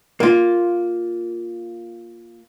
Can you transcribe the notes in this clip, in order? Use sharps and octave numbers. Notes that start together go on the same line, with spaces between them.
A#3 F4